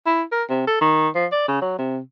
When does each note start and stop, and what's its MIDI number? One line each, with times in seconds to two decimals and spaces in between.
0.06 0.23 64
0.32 0.43 70
0.49 0.66 48
0.67 0.77 69
0.81 1.09 51
1.15 1.26 53
1.32 1.46 74
1.48 1.57 49
1.62 1.77 54
1.78 1.98 48